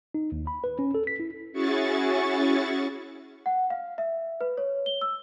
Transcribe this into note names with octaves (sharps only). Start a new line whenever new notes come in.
D#4
D#2
B5
B4
C#4
A4
B6
E4
C#4 E4 F#4 G#4 C#6 A6
F#5
F5
E5
B4
C#5
G7
E6